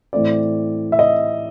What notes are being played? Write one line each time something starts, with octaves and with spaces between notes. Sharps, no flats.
A2 E3 A3 C4 D5
E5
D#5